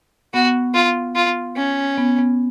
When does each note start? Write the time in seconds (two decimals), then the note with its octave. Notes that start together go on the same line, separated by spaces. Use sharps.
0.34 B3 F#4
0.74 F4
1.15 F4
1.56 C#4
1.98 B3
2.18 B3